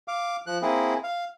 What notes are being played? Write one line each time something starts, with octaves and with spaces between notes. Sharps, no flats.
F5 D6
F3 F#6
A#3 C4 E4 G#4
F5